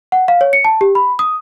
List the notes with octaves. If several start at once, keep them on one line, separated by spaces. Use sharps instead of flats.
F#5
F5
C#5
C#7
A5
G4
B5
D#6